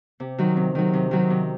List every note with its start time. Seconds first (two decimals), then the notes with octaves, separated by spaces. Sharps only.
0.20 C3
0.38 D#3 F#3
0.57 C3
0.75 D#3 F#3
0.94 C3
1.11 D#3 F#3
1.30 C3